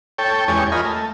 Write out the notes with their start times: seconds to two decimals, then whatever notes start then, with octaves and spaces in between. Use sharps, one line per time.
0.18 A4 C#5 G5
0.48 E2 G#3 C#4 G4 C#5
0.72 F4 A#4 D#5 G#5 B5
0.85 A3